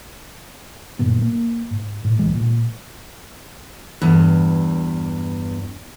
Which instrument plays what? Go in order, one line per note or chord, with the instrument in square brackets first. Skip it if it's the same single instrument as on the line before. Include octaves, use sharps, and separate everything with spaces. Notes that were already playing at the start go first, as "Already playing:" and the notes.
[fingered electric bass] G1 F#2 A#2 B3
A#3
G#2
A2
D#1 B1 E3 G#3
A#2
[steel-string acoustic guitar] E2 G2